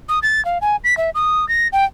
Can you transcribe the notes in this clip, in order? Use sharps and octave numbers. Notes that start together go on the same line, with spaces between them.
D#6
A6
F5
G#5
B6
E5
D#6
A#6
G5